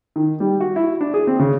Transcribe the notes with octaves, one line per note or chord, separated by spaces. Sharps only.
D#3
G3
F#4
E4
D4
G#4
C4
C#3